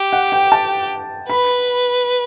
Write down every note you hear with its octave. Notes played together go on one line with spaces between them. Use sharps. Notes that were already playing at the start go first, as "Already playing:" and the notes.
Already playing: G4
F#5
G5
A5
B4 B5